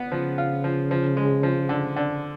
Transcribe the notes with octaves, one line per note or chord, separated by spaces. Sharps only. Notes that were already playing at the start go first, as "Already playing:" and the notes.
Already playing: B3
C#3 F3
F4
F3
F3
G#3
F3
D3
D3